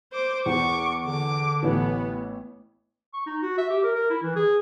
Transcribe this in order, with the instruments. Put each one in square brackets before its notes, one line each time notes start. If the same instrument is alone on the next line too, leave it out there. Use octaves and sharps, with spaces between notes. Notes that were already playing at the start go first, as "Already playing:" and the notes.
[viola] C5 D6
[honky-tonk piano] E2 [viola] C#6 D6
[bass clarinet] D3 [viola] D6
[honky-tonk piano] A1 E3 [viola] B3
[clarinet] C#6
D#4
F#4
E5
G4
A#4
A#4
E4
E3
G#4